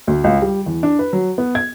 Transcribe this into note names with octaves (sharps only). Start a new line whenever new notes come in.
D2
C#2
G3
E2
D4
B4
F#3
B3
G#6